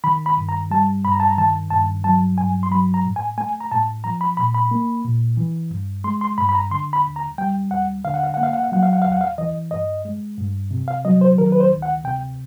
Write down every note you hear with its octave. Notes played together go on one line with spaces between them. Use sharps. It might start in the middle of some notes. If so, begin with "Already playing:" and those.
D#3 B5
B5
G2
A#5
G3 A5
G2 B5
A#5
A5
A#5
D#3 A5
G2 A5
F#3 A5
G2 G#5
C6
F#3 B5
A#5
A2
G#5
A3 G#5
A#5
A2 A5
F3 A#5
B5
A#2 B5
B5
A#3
A#2
E3
G2
G#3 C6
C6
G2 B5
B5
A#5
D3 C6
B5
D#2
A#5
G3 G5
D#2 F#5
D3 F5
F#5
F5
A#3 F#5
F5
F#5
F5
F#3 F#5
F5
F#5
D#2 F5
F#5
F5
E3 D#5
G2 D#5
G#3
G2
C3
F5
F#3 D#5
C5
D#3 A#4
B4
C5
D2
F#5
C3 G5